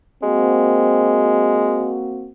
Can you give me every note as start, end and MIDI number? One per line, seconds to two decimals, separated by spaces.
0.23 1.98 56
0.23 2.31 58
0.23 2.31 60
0.23 2.31 66